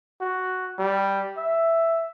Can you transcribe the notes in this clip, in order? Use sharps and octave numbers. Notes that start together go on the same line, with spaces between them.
F#4
G3
E5